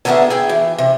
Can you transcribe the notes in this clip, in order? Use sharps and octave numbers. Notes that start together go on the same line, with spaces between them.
D3 D#3 A3 B3 G#4 E5
G#4 G5
E3
C3